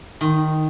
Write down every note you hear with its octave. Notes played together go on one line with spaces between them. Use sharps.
D#3